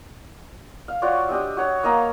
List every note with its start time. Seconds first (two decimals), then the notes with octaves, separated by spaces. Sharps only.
0.88 F5
1.02 F4 F#4 C#5 D5
1.29 D4 G4 D#5 E5
1.57 F#4 C#5
1.83 A#3 D#5 F5 A#5